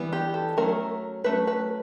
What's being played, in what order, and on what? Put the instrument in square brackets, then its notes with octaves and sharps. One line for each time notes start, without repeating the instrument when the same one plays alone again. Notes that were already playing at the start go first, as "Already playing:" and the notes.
Already playing: [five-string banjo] E3 G3 B3
G4
A4
F#3 A3 C#4 A#4
F#3 A3 C#4 B4
B4